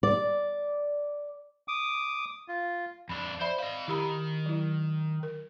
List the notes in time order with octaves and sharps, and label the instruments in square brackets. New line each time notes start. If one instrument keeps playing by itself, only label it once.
[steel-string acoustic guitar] D5
[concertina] D6 D#6
F4
[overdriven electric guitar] F2 D4 [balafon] B5
[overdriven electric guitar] C5 [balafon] D5 E5 B5
[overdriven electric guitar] D#5 B5 [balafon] F5
[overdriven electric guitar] D#3 [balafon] E4 G4 B5
[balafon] F#3 E4
A#4